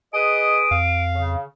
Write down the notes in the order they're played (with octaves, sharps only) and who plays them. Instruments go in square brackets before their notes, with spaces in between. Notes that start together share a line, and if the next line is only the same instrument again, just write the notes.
[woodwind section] G#4 B4 D#6 [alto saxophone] D#5 [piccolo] D7
[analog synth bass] F2 [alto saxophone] F5
[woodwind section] C#3